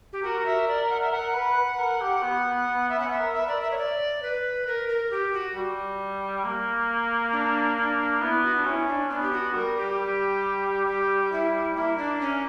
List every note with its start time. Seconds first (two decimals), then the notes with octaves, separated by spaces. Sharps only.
0.13 G4
0.23 F#4 A#4
0.46 E5
0.68 D5
0.89 F#5
1.01 E5
1.12 A#4 F#5
1.34 B4
1.57 B4
1.78 A#4
2.01 G4
2.23 B3
2.45 B3
2.68 B3
2.89 B3 E5
2.98 C#4 F#5
3.06 B3
3.11 E5
3.20 A#4
3.34 E5
3.40 B4
3.47 A#4 D5
3.61 E5
3.71 C#5
3.78 D5
4.23 B4
4.67 A#4
4.89 A#4
5.11 G4
5.34 F#4
5.55 G3
6.44 A#3
7.33 D4
7.77 D4
8.21 B3 E4
8.43 F#4
8.55 D4
8.65 C#4 E4
8.88 D4
9.10 B3 D4
9.23 G4
9.33 F#4
9.55 G3 A#4
9.76 G4
9.99 G3
10.87 G4
11.32 E4
11.76 A#3 E4
11.98 D4
12.21 C#4